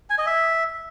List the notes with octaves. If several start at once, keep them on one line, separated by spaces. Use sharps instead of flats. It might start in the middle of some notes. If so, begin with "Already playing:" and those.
G#5
D#5
E5